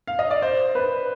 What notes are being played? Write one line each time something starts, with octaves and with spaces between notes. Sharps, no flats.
F5
D#5
D5
C5
B4